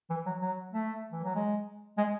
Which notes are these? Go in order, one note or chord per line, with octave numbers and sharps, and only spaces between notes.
E3
F#3
F#3
A3
E3
F#3
G#3
G#3